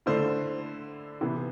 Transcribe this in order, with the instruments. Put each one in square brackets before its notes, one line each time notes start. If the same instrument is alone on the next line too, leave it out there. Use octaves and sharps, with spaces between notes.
[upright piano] D3 A3 E4 C5
C3 E3 B3